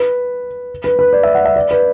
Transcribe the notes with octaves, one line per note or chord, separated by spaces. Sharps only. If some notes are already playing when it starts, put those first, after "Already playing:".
Already playing: B4
B4
B4
D5
E5
F#5
E5
D5
B4